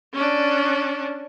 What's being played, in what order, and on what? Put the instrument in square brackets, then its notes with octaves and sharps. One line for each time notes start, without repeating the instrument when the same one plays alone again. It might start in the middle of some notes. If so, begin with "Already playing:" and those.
[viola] C#4 D4